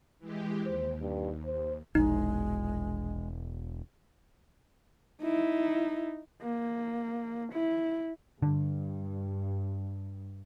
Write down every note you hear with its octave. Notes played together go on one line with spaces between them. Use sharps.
E3 G#3 G4
D#2 C5
G2
C5
E1 A#1 G#3 D#4
D#4 E4
A#3
E4
G2 D3